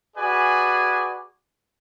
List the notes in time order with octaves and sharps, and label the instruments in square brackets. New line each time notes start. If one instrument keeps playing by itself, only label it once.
[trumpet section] F#4 G#4 B4 D5 G#5